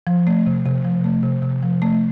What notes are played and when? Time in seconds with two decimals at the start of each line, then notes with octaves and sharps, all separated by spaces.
0.07 F3
0.27 A3
0.46 C3
0.66 C3
0.84 F3
1.04 A3
1.23 C3
1.43 C3
1.63 F3
1.82 A3